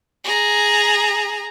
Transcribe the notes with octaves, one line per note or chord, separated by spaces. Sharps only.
G#4 A#5